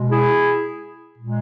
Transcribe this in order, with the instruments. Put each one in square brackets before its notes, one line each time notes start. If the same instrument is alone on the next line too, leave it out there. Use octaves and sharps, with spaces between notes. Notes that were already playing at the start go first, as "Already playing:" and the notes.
Already playing: [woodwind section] B2 G#3
E4 G#4
A#2 G#3